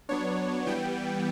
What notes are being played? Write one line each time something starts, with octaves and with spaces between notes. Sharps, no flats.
F#3 B3 D4 C#5
E3 G3 B3 G5